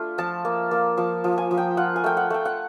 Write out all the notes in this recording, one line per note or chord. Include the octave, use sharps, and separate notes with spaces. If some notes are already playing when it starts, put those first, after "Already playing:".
Already playing: A3 D4 F4
F3 A5
A#3
A#3
F3 A5
F3
G#5
F3
G5
F4 F#5
G#5
A3 G5
F#5
A3 G5
F#5